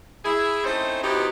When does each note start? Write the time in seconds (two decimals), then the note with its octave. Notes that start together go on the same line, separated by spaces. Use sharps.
0.24 E4 G#4
0.64 A3 C4 C#4 D#4 E4 C5
1.03 C3 E3 B3 D#4 F#4 G4